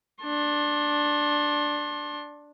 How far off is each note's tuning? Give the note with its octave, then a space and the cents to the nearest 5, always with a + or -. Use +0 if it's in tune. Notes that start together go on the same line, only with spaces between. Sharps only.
D4 +0 C6 +40